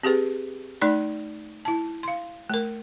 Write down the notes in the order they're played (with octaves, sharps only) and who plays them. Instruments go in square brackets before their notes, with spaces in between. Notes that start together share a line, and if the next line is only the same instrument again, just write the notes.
[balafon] C4 G4 G#4 B4
A3 D#4 D5 B5
E4 A5
F5 C6
A3 A#4